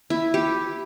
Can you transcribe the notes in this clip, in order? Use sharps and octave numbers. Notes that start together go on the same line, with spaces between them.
E4
G4